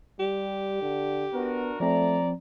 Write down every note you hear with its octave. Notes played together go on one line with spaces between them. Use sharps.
G3 G4
D3
B3 D4 F#4 A#4
F3 A3 C4 D5 A#5